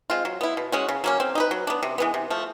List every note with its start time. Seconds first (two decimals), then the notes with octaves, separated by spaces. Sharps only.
0.10 G#3 C4 F4
0.25 F#3
0.41 B3 E4
0.57 B2
0.72 G#3 C#4 F#4
0.88 C#3
1.04 F#3 A#3 C#4
1.20 C4
1.35 D#4 G4 B4
1.51 F#3
1.67 B3 D4
1.83 C3
1.98 E3 G#3 B3
2.14 C3
2.30 F3 A3